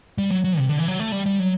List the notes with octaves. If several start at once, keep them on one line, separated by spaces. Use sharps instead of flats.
G3
F#3
F#3
C3
D3
E3
F#3
A3
G3
G3
F#3